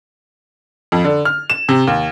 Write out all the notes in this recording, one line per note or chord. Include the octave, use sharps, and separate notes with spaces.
F2
D3
F6
E7
C3
D#2